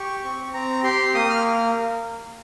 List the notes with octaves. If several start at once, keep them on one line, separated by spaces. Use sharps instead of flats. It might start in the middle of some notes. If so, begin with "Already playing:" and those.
Already playing: G4 C#6
C4
C4 A#5
G4 C6
A#3 D#6
F6